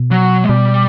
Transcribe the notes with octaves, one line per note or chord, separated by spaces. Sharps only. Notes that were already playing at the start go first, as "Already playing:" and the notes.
Already playing: B2
F#3
G#3
B2 G3